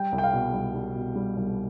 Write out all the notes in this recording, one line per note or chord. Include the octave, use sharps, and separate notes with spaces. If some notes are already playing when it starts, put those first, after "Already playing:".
Already playing: G3 G5
C2
G5
F5
B2
C2
G3
B2
G3
C2